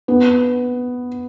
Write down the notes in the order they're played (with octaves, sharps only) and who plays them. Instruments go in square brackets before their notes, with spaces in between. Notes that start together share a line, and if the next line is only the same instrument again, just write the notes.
[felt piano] B3